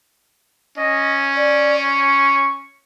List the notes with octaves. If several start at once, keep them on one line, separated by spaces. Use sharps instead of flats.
C#4 D#5
D5
C#6